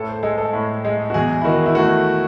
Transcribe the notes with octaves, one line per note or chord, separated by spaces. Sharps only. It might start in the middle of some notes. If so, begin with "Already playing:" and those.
Already playing: A2 A4
C5
G#3 A4
A4
A2
G#3
F#4
E2 G#4
E4
D#3 F#4
E4
A3 F#4